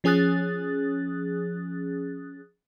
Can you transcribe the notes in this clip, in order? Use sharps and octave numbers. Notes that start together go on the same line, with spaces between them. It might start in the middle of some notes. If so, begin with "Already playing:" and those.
F3 C#4 G#4 D#6 F#6 A6